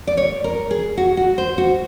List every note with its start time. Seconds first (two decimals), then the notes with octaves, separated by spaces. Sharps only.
0.07 D5
0.17 C#5
0.44 A#4
0.71 G#4
0.97 F#4
1.17 F#4
1.38 C5
1.58 F#4